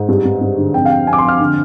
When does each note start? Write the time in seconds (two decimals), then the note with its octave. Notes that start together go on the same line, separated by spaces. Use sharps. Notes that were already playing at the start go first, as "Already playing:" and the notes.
Already playing: G#2
0.09 G2
0.25 G2
0.41 G2
0.58 D3
0.74 F2 G5
0.85 F5
0.90 F2 G5
1.07 F2 G#5
1.13 D6
1.18 C6
1.24 F2 F6
1.40 D3